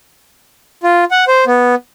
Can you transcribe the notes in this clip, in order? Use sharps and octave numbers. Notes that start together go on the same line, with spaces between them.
F4
F#5
C5
B3